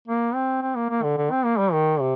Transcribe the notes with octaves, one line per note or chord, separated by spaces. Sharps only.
A#3
C4
C4
A#3
A#3
D3
D3
C4
A#3
G3
D#3
C3